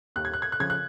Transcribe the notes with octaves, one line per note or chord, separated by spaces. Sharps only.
D#2 F#6
G#6
F#6
G#6
F#6
C#3 F3 G#6
F#6